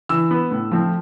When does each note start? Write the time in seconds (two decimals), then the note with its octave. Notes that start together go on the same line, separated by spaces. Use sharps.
0.09 E3 E6
0.31 B3
0.51 A2
0.71 F3 A3 C4